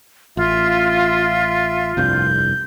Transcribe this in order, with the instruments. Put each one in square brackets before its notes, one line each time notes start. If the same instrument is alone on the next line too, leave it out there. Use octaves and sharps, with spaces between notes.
[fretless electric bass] A1 [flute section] F4 [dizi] E5
[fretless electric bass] F1 C2 G2 [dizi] G6